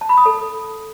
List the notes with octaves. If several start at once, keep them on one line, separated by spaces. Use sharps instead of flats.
A5
B5
D#6
A4